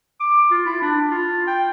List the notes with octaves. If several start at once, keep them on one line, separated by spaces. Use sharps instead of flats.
D6
F4
E4
D4
F4
G5